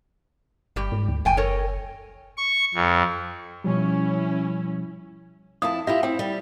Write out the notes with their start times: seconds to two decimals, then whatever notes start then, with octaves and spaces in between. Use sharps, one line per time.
0.76 G1 G3 G4
0.92 G#2
1.08 D2
1.25 F#1 D#3 G5 G#5
1.37 A4 A#4 C#5
2.38 C#6
2.74 F2
3.64 B2 F3 G3 C#4 E4
5.62 F2 E4 A5 D#6
5.87 E4 F4 G4 E5
6.03 C4 E4 G5
6.19 G3